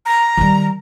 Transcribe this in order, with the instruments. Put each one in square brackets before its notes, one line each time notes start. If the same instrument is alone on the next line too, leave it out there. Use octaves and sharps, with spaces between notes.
[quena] A#5
[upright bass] D#3 G3